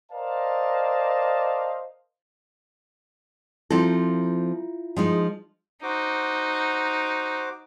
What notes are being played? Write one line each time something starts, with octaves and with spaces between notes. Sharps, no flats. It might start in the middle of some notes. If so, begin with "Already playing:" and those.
A#4 C5 D5 D#5 F5 A5
F3 C4 E4 F4 A4
F3 G#3 D#4
D#4 F#4 C5 D6